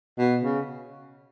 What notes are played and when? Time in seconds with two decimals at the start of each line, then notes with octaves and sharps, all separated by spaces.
0.18 B2
0.43 C#3